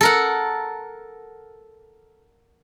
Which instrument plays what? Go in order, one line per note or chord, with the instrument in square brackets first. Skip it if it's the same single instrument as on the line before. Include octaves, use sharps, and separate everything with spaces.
[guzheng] A4 A#4 F#5